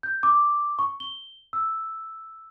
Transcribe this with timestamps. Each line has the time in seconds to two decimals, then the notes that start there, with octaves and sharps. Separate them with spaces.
0.03 G6
0.23 D6
0.79 C#6
1.00 G7
1.53 E6